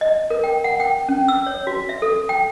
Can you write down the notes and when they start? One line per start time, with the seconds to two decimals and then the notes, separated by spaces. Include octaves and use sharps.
0.01 D#5
0.30 A#4
0.44 G5
0.64 F#5
0.80 G5
1.09 C#4
1.28 E6
1.46 C#5
1.67 F#4
1.89 E5
2.02 A4
2.29 G5